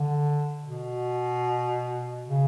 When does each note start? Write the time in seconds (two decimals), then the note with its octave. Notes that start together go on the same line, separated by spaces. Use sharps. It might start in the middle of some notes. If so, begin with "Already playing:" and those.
Already playing: D3
0.65 B2
2.28 C#3